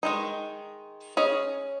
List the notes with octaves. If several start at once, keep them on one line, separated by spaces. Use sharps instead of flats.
D#3 G#3 D#4
C#4 G#4 D#5